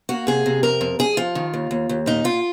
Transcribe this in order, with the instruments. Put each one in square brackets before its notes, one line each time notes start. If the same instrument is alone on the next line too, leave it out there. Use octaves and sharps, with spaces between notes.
[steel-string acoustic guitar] A#3 F#4
C3 G#4
C3
F2 A#4
F2
F2 G#4
F3 F4
D#3
D#2
D#2
D#2
A#2 D#4
A#2 F4